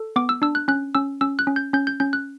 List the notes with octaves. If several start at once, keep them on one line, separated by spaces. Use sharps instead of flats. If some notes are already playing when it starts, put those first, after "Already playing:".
Already playing: A4
B3 D6
E6
D4 E6
F#6
C#4 F#6
C#4 E6
C#4 E6
F#6
C#4
G6
C#4 G6
G6
C#4 G6
F#6